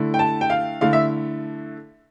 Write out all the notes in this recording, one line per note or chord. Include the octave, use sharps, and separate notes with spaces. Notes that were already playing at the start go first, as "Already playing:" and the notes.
Already playing: D3 A3 E4
G5
A5
G5
F5
D3 A3 E4 F5
E5